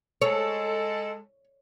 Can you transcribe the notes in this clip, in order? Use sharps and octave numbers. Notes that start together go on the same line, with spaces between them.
G#3 A4 C#5